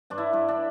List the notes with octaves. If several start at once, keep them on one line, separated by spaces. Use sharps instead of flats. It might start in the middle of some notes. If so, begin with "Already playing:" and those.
G2 D4
E4
G2
D4